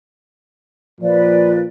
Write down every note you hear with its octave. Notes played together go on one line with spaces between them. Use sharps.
A#2 F3 B4 D5